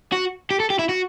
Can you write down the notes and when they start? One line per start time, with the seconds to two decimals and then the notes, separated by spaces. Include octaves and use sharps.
0.13 F#4
0.51 G4
0.60 A4
0.70 G4
0.79 E4
0.89 F#4